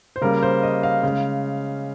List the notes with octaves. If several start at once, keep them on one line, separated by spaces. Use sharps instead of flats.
C5
C#3 G3 A#3 A#4
C5
D#5
F5
C#3
G#3